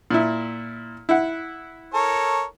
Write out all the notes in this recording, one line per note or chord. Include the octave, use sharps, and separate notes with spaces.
A#2 E4
E4 F#5
A4 A#4 C#5